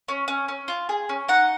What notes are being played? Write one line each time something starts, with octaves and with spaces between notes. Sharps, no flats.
C#4
C#4
C#4
F4
G#4
C#4
D#4 F#5